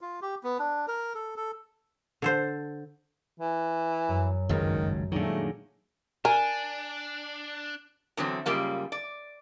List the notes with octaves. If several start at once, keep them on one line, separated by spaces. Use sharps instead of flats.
F4
G4
B3
D4
A#4
A4
A4
D3 A4 C5
E3
F#2
G#1 C#2 G2 D#3
A#2 D#3 F#3 G#3 A3 D4
D4 A#4 G#5
E2 D3 F#3 C4
F#2 C#3 G3 A#3 F4
D5